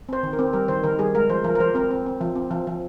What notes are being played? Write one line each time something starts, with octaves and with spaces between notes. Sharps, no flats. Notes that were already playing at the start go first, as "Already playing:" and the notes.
C4 C5
D#3
A#4
C4
G3 A#4
D#3 C5
D#3 A#4
G3 G#4
G#3 A#4
F3 C5
F3 A#4
A#4
F3 C5
C4 A#4
C4
C4
F3
C4
F3
F3